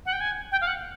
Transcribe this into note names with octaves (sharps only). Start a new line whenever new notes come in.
F#5
G5
G#5
G5
F5
F#5